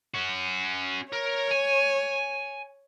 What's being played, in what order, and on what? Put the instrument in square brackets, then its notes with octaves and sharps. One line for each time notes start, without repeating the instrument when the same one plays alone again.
[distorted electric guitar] C#4 F#4
[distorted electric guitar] A#4 [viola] C#5
[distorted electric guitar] G#5